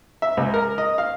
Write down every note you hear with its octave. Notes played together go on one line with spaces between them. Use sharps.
E5
C#2
A#4
D#5
F5